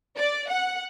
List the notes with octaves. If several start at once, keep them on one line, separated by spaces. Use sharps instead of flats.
D5
F#5